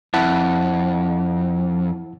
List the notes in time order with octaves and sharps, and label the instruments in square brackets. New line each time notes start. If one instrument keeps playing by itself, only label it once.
[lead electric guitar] F2 [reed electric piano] E4 F#5 A5